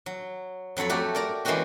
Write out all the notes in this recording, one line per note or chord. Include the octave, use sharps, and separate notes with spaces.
F#3
F2 F#3 A4 C#5 B5
A3 F#4 G4 D5
A#4 D5 A#5
E3 G#3 A#3 C#4 F#4 G4